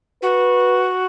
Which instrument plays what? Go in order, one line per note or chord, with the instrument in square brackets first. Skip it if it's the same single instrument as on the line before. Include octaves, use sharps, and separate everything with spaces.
[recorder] F#4 [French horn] B4